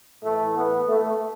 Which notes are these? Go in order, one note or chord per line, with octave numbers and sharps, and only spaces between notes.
A2 E3 A3
B3
A3